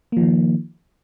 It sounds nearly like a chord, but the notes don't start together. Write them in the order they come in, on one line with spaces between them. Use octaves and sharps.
A#3 F3 D#3